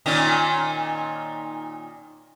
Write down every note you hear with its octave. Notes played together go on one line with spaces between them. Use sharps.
A#2 D#3 C#4